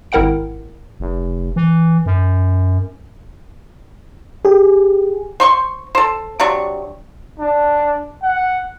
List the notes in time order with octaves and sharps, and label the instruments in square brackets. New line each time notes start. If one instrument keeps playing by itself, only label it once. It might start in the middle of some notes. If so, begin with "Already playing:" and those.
[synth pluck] G#1 E4 A#4 F#5 G5 D7
[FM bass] F1
E3
F#2
[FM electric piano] G4 G#4
[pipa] C5 C6 C#6
A4 C5
C3 F#3 D4 C#6
[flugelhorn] D4
F#5